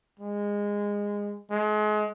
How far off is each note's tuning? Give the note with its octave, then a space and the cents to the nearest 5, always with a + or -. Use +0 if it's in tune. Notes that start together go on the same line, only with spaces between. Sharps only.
G#3 -20
G#3 +35